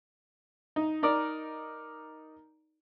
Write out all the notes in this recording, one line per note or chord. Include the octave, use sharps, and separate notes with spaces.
D#4
D#4 A#4 D5